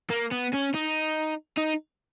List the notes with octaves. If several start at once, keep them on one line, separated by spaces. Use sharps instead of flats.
A#3
B3
C#4
D#4
D#4